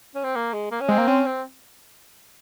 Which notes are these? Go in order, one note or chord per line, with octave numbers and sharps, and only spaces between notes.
C#4
C4
A#3
G#3
A#3
C#4
G#3 C4
A#3
C4 C#4
C4